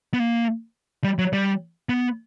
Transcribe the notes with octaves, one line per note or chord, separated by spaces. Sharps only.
B3
A#3
G3
F#3
G3
B3